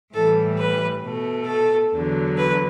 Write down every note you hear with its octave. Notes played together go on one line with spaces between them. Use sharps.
A2 E3 G3 A4
B4
B2 A3
A4
E2 D3 F#3
B4